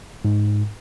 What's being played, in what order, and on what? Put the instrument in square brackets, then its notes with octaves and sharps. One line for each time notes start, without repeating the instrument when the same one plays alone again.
[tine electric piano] G#2